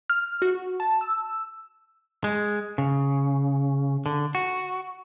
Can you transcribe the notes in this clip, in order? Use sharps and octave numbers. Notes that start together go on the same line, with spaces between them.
F6
F#4
A5
E6
G#3
C#3
D3
F#4